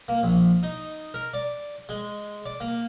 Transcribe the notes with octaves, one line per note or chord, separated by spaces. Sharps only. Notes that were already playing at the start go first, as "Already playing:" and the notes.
A#3
A#1
D#4
A#4
D5
G#3
D5
A#3